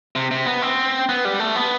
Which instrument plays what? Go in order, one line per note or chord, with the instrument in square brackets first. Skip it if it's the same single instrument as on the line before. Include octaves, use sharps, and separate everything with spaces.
[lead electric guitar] C3
C3
B3
C4
B3
G3
A3
B3